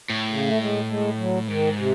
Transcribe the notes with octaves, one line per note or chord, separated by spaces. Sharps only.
A2
C#3
A3
G#3
G#3
F#3
G#2 D#3
C3